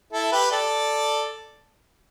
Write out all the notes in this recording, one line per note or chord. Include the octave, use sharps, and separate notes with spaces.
E4 A4
G4 B4
A4 D5